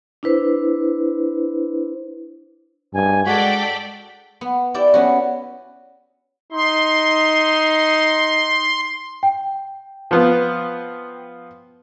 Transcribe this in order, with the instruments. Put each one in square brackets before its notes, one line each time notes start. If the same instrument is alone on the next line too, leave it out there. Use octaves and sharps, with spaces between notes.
[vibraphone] D4 E4 B4 C5
[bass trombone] G2 [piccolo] G#5
[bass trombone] G#3 [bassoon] F#4 [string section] A4 D5 G5 [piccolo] B6
[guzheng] B3
E4 G4 D5
B3 C#4 F#4
[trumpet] D#4 [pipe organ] C6
[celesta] G5
[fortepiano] F3 B3 F4